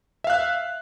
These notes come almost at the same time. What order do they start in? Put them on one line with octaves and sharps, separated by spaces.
E5 F5 F#6